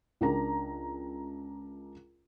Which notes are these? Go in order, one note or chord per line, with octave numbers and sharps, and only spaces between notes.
C#2 D4 A#4 A#5